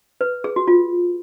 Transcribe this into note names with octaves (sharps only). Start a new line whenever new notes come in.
B4
G#4
F#4
F4